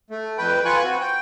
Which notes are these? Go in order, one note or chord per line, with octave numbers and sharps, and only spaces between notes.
A3
F2 B4 G5
F4 B4 G#5 C#6 F#6
C4 F#4
G5